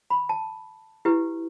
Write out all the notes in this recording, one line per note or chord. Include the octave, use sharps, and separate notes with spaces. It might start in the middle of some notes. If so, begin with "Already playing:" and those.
B5
A5
E4 G4 B4